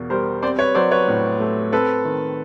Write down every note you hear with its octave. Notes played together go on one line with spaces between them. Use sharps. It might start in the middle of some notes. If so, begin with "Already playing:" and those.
Already playing: E2 B2 A#3
G3 A#4 C5
C4 C5 D5
B4 C#5
F#3 C5 D5
B4 C#5
A2
A3
C4 A4 B4
D#3